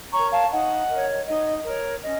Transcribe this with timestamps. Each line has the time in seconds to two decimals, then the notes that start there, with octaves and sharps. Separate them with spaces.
0.13 A#4 C#5 A#5 C#6
0.32 F5 A5
0.50 D#4 D#5 F#5
0.89 A#4 C#5
1.27 D#4 D#5
1.65 A#4 C#5
2.03 C#4 D#5